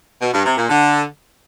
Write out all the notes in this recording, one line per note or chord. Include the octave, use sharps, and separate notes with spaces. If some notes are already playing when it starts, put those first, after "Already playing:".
B2
G2
C3
A#2
D3